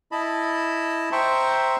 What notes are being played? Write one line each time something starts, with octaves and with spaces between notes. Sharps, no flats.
E4 D#5 A5 B5
C5 E5 G5 A#5 C6 C#6